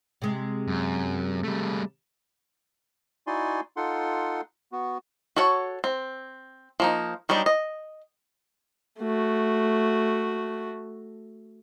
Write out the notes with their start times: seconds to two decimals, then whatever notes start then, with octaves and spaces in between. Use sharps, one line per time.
0.22 C3 G#3
0.68 F#2
1.44 G3 A3
3.27 D#4 E4 F#4 D5 G#5 C6
3.77 D#4 F4 A4 F#5 C6
4.72 B3 F#4
5.36 F#4 A4 C#5 F#5
5.84 C4
6.80 F3 A#3 D#4
7.29 F#3 G3 B3 D4 D#4
7.46 D#5
8.99 A3 F#4